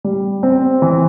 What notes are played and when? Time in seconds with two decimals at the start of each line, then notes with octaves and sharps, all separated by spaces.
0.04 G3
0.43 C4
0.82 E3